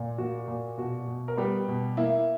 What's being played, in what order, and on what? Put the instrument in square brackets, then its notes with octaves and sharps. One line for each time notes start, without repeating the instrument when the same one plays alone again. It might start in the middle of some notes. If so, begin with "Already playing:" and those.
Already playing: [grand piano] A#2
A#3 F#4
A#2
B2 F#4
B2
A#4
G3 B3 G4
B2
A#3 E4